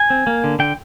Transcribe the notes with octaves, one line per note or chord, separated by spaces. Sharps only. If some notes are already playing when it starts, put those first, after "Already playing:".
Already playing: G#5
C4
A#3
D3
D3 G5